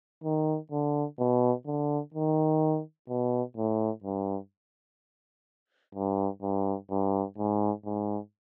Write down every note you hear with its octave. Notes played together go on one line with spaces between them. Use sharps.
D#3
D3
B2
D3
D#3
B2
A2
G2
G2
G2
G2
G#2
G#2